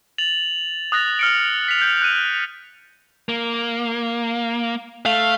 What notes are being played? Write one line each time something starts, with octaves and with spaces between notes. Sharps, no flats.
A6 F7 F#7
D#6 F#6 A6 A#6
F6 C#7 D7
B6 F7
G6 C#7
F#6 D#7
A#3
A3 F5